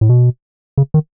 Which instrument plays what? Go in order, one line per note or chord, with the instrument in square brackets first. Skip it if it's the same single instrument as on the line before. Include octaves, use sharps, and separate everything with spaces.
[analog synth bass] A2
B2
C#3
D#3